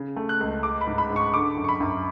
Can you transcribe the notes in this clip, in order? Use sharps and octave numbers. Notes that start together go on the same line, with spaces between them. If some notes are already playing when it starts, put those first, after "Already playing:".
Already playing: C#3
A3
F#6
C#2
G#3 D6
B5
G#2
B5
G#2
C#6
D3 D6
F#2
C#6
B5
F#2